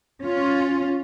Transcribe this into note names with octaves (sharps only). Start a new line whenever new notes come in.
C#4 F4